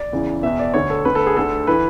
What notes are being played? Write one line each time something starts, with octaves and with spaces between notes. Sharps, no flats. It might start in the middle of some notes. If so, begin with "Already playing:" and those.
Already playing: D5
E2 C#3 E3
E2 B2 E5
D5
D2 D3 C#5
A4
D2 D3 B4
A4
G#4
D2 D3 A4
E3 B4